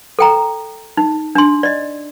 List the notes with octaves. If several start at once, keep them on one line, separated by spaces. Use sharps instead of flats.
A4 G5 A#5
D#4
D4 C6
D5 D#5